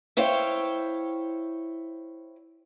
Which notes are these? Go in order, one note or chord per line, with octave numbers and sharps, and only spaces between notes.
E4 C5 C#5 F5 G5